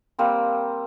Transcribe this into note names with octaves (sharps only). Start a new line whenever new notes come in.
G3 A#3 C4